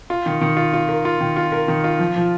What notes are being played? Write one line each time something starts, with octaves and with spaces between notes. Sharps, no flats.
F4
D#3
D#3
F4
F4
A#4
F4
D#3
F4
A#4
D#3
F4
F3
F3